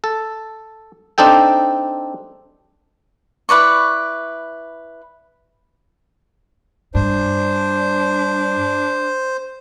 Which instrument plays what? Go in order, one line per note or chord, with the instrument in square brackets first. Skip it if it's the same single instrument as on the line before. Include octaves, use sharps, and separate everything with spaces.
[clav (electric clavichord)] A4
C4 D4 D#4 A4 G5
[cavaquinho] E4 B4 D5 C#6
[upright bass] G2 [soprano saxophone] D4 [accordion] C5